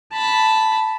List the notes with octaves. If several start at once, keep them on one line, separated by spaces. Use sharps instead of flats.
A5 B5